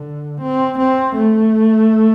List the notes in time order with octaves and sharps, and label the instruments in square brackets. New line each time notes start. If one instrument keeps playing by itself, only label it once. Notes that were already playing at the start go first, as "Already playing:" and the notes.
Already playing: [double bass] D3
C4
C4
A3